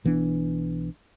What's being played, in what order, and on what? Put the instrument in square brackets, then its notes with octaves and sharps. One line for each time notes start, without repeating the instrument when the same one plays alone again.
[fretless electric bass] B1 E3 B3 D4